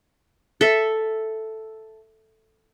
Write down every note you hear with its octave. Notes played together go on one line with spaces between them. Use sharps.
A4 E5